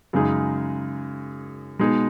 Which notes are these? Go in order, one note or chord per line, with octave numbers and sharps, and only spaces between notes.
F#2 C#3 G#3 D#4 G#4
B2 G#3 D#4 G#4